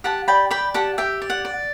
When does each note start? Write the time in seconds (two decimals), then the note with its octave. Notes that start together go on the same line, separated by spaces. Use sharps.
0.04 G4 F#5 A5
0.28 D5 G5 B5
0.51 D5 G5 B5
0.74 G4 F#5 A5
0.98 G4 E5 G5
1.22 D5
1.30 F#5
1.45 D5